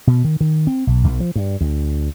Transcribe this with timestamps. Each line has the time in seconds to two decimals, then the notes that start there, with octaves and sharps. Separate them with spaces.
0.07 B2
0.24 D#3
0.41 D#3
0.67 C4
0.87 B1
1.04 B1
1.20 F3
1.36 G2
1.61 D2